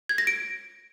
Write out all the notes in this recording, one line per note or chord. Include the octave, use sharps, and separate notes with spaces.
G#6
A#6
D7